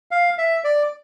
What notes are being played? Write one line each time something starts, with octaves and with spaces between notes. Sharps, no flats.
F5
E5
D5